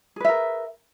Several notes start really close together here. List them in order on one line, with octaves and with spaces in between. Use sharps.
G#4 B4 E5 A#4